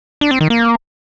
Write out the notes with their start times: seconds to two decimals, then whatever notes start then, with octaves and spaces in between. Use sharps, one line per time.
0.21 D4
0.31 C4
0.41 D#3
0.50 A#3